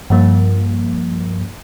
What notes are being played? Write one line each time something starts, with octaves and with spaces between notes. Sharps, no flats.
G2 F3 A#3